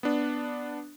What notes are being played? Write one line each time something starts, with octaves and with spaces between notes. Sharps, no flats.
B3 D4